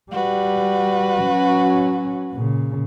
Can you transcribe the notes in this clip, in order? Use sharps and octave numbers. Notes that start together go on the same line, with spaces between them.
G3 F#4 B4
F#3 C#4
A#2 C#3